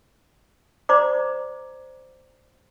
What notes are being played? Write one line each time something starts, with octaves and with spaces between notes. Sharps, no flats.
C5 D5 A#5 D6